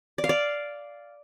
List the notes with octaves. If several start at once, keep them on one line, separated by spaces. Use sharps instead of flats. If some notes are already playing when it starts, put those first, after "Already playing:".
D5
F5
D5